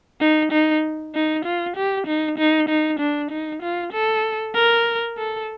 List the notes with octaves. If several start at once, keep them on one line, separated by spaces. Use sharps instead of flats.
D#4
D#4
D#4
F4
G4
D#4
D#4
D#4
D4
D#4
F4
A4
A#4
A4